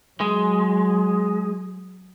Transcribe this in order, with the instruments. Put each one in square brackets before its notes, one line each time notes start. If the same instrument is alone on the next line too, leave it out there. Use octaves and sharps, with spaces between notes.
[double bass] F#3 [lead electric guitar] G#3